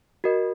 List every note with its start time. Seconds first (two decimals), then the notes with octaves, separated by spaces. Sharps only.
0.24 F#4 A#4 D#5